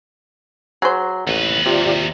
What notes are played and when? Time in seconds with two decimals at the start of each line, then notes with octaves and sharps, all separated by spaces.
0.82 F#3 G#4 C5
1.27 A1 D#2 B4
1.66 C3 F4 G4 D5